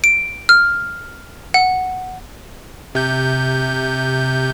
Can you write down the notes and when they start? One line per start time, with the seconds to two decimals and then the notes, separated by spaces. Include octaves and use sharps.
0.04 D7
0.49 F6
1.54 F#5
2.95 C3 G6